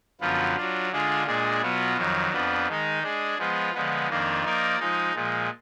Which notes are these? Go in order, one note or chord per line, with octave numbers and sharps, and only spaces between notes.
F#2 D3 F3 B3 F4
F#3 D4 F4
D3 G#3 D4 F4 G#4
A#2 G#3 D4 G#4
B2 F#3 B3 F4
F2 D#3 F#3
F2 F3 B3 D4
D#3 G#3 D#4
G#3 D4 G#4
F3 G#3 B3 F4
D3 F3 G#3 B3
F2 D#3 A#3 D4 F4
F3 A#3 D#4 A#4 D5
F3 G#3 D#4
A#2 F3 G#3